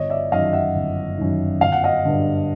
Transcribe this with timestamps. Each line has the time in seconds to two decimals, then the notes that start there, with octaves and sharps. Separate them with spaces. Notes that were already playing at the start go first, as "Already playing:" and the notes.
Already playing: G1 C#5 D#5
0.10 D5 E5
0.32 F#2 D#3 D#5 F5
0.53 E5 F#5
0.75 G1
1.18 F#2 D#3
1.61 G1 F5
1.72 F#5
1.84 D#5 F5
2.05 G2 D3